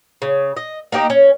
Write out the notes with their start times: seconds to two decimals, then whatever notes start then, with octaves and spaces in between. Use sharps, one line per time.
0.22 C#3
0.57 D#5
0.92 A#3 D#4 G4 D#5
1.10 C#4